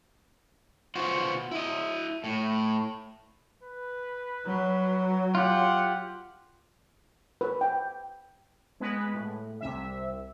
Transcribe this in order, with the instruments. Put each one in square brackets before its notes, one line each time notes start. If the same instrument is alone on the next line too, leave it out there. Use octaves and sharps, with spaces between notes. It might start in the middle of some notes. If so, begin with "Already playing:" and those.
[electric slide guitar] B3 F4 F#4 C5 F#5
E4 D#5
A2
[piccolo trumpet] B4
[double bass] F#3
[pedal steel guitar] F4 G4 [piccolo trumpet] F#5
[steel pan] B4
G5
[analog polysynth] G#3 B3 B4
A2
C2 C3 E5